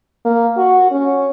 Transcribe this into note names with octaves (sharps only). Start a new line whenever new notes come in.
A#3
F#4
C#4